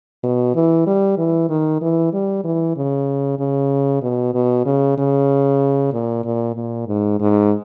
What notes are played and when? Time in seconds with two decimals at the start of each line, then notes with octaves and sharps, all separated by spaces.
0.24 B2
0.55 E3
0.87 G3
1.18 E3
1.50 D#3
1.82 E3
2.13 G3
2.44 E3
2.76 C#3
3.39 C#3
4.02 B2
4.34 B2
4.66 C#3
4.98 C#3
5.93 A#2
6.24 A#2
6.55 A#2
6.87 G#2
7.20 G#2